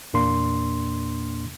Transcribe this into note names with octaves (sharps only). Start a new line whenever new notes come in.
E2 A#2 A#3 D4 C6